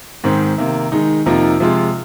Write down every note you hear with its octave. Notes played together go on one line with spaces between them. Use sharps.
G#2 D#3 C4
C3 D#3 A#3
D#3 G#3 D#4
F2 C3 F3 A#3 D#4
C3 F3 G#3 F4